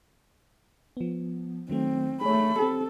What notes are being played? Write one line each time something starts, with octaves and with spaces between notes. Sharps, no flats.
F3 B3
D#3 F#3 A3 C4
A3 G#4 C#5 B5
C4 G4 A4